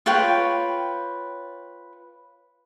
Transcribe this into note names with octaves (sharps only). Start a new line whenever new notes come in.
F4 B4 C#5 G5